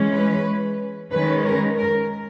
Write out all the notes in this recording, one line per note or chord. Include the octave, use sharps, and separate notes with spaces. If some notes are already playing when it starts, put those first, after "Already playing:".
Already playing: E3 G#3 C#4
B4
D#3 G#3 C#4 B4
A#4
A#4